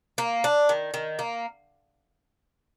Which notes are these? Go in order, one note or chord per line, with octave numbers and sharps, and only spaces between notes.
A#3
D4
D#3
D#3
A#3